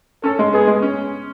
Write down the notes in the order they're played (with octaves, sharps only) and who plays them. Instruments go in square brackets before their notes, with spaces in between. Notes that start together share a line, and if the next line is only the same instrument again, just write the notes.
[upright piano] C#4 [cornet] A4
[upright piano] G#3
[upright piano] B3 [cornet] G#4
[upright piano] G#3
C#4